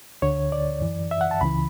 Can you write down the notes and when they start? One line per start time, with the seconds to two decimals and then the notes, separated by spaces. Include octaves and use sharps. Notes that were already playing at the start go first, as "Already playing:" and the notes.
0.22 D2 D3 C#5
0.52 D5
0.81 F#2 E3
1.11 E5
1.21 F#5
1.31 A5
1.41 C#2 C#3 E3 B5